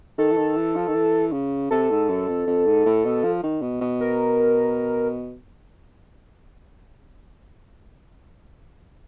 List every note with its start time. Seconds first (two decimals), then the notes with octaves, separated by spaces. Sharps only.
0.18 D#3 A4
0.32 E3
0.37 D#3
0.56 E3
0.76 F3
0.88 D#3
0.95 E3
1.32 C#3
1.71 C3 A4
1.90 G#2
2.09 F#2
2.28 F2
2.47 F2
2.66 G#2
2.86 A2
3.05 B2
3.24 F3
3.43 D#3
3.62 B2
3.81 B2
4.01 A#4